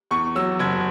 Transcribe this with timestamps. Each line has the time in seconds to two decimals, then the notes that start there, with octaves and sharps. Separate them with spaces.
0.11 E2 C#6
0.35 F#3 E6
0.59 F#1 G#6